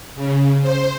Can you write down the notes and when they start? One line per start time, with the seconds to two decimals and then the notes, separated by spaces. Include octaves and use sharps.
0.15 C#3
0.62 C5